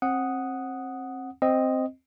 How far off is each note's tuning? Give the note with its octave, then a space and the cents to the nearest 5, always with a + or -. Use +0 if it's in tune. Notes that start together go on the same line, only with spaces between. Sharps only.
C4 +30 F#5 +0 D#6 +0
C4 +0 D#5 +0